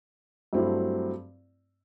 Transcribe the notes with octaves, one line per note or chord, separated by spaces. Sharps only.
G2 F#3 A3 C4 E4